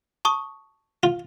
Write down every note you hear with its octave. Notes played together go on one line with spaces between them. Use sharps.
A5 C#6 D#6
F4